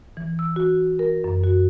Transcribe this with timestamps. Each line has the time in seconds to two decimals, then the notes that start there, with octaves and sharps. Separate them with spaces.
0.17 E3
0.39 E6
0.56 F#4
0.99 A#4
1.24 F#2
1.44 F#4